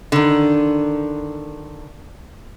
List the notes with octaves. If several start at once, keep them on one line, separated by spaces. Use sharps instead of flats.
D3 D#3